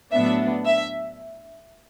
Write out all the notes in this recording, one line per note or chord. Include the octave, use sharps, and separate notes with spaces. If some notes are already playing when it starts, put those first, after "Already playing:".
A2 F#3 B3 D4 E5
E5